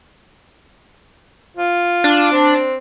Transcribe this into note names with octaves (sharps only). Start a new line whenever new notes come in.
F4
D4
C4